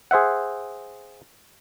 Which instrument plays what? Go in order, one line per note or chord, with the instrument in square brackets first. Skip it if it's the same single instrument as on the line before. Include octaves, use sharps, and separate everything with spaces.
[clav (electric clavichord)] G#4 C5 E5 F#5